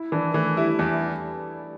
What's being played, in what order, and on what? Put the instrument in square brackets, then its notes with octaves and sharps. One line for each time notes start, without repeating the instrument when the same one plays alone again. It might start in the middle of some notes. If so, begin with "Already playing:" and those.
Already playing: [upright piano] E4
[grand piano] E3 [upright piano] D4
[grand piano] E3 [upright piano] A3
[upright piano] G3 [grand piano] E4
[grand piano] E2 [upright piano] E3